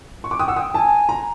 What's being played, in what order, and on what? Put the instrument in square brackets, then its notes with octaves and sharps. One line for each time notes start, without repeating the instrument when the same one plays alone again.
[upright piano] C#6
D6
[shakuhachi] G5 [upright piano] D#6
[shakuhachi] F#5 [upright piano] E6
[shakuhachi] G5 [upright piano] D#6
[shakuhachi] G#5 [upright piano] A5
[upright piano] A#5